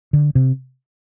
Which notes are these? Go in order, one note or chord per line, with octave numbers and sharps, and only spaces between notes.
D3
C3